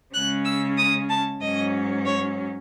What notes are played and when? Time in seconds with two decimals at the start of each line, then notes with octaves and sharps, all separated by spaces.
0.14 C#3 G#3 C#4 F#6
0.45 E6
0.77 D#6
1.09 A5
1.41 G#2 F#3 C#4 D#5
2.05 C#5